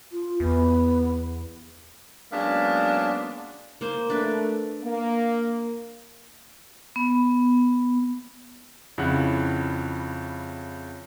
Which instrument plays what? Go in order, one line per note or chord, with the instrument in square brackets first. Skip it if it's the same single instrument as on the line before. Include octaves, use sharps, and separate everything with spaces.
[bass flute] F4
[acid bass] E2 [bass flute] B3
[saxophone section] F#3 G#3 A#3 B3 C#4 D4
[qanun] A#3 C5
[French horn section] A3 [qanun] D4 B4
[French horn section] A#3
[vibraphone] B3
[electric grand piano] F2 C#3 E4 F#5 F#6